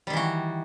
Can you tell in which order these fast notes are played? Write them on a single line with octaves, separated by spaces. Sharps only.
G3 D#3 E3 F#4